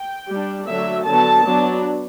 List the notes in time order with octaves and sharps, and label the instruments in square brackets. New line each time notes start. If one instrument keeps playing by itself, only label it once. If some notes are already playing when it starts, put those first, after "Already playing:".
Already playing: [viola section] G5
G3 D4
D3 F#3 A3 E5
D3 F#3 B3 A5
F#3 B3 D4